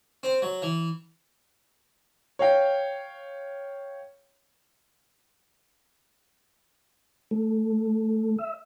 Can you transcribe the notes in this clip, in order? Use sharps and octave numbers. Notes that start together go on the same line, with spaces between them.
C4
F#3
E3
C#5 F5 G5
A3
E5